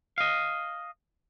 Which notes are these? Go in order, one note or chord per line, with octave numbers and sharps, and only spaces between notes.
D#5 F5